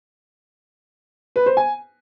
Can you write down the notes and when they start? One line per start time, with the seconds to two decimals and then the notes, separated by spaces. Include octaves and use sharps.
1.36 B4
1.46 C5
1.57 G#5